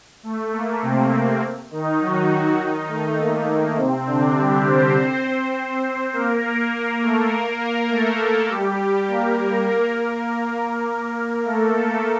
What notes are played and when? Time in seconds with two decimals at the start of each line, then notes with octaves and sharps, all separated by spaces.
0.23 A3
0.52 A#3
0.82 C3 C4
1.12 A#3
1.71 D#3 D#4
2.00 F#3 F#4
2.59 D#3 D#4
2.88 A3
3.18 A#3
3.77 C3 C4
4.07 D3 D4
4.36 G3 G4
4.66 C4 C5
6.13 A#3 A#4
6.72 A#3 A#4
7.02 A3 A4
7.31 A#3 A#4
7.61 A#3 A#4
7.90 A3 A4
8.49 G3 G4
9.08 A#3 A#4
9.67 A#3 A#4
9.97 A#3 A#4
11.44 A3 A4